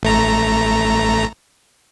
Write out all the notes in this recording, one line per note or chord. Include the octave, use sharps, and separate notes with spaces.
A1 A3 A#5